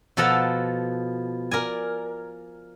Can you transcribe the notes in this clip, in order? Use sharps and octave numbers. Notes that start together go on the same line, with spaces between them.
B2 F3 A4 F#5 A5 A#5
A#4 D5 G#5